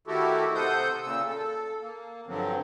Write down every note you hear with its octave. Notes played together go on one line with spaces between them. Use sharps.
D#3 A3 E4 F#4 G4 A4
C3 A4 C5 F#5 D#6 G6
A#2 C#3 E6
A4
A#3
G2 D3 F3 F#3 C4